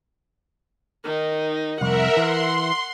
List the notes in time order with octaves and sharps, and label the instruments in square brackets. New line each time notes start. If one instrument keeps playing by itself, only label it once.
[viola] D#3 D#4
[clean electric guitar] C2 F2 [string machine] A#4 E5 [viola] F#5
[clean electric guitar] E3 [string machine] C6